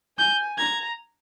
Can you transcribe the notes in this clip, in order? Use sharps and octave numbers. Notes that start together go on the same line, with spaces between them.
G#5 G6
A#5 G#6